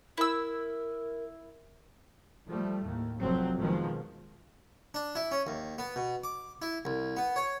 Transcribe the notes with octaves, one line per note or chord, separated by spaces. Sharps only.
E4 A#4 E6
F3 G3 A3
D#2 A2
F1 F2 C3 F#3 C4
B2 D#3 F3 G#3
D4
E4
C#4
D#2
B3
B2
D6
E4
C2
B3
C#5